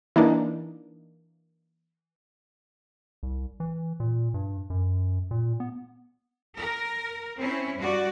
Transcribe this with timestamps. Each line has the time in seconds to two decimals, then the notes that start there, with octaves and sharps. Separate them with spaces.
0.16 E3 A#3 D4 D#4
3.23 C2
3.60 E3
4.00 A#2
4.34 G2
4.70 F#2
5.31 A#2
5.60 B3
6.56 A#4
7.40 C4 C#4 E4
7.78 G2 F#4 D5